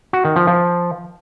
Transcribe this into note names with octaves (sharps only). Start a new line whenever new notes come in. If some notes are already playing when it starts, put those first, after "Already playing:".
F#4
D#3
F3
F3